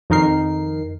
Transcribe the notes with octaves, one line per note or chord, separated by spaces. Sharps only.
F2 D#3 D#4 A#4 C7